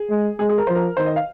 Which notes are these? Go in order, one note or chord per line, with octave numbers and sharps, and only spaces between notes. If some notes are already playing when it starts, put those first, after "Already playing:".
Already playing: G#4
G#3
G#3 G#4
G#4
A#4
F3 C5
A#4
D#3 C5
D#5
F5